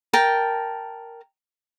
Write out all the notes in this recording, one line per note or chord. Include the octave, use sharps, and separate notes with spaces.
A#4 G5 A5